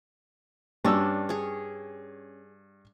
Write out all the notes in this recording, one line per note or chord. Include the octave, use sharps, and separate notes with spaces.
G2 C#4 D4 E6
G#4 C#5